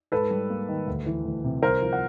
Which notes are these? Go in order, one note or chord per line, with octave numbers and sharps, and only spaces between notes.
G#2 A4 B4
G3
A#3
D#3
D2
E3
D2
C3
C2 A#4 C5
F3
F#5